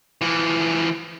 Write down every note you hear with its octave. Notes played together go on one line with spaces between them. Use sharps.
E3 F3